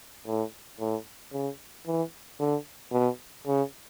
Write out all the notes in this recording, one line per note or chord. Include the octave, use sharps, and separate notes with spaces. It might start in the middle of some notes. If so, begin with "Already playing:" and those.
A2
A2
C#3
E3
D3
B2
C#3